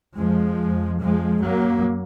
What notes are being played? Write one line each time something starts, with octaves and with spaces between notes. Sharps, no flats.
F2 F3 G#3
F2
F2 F3 G#3
F#2 F#3 A#3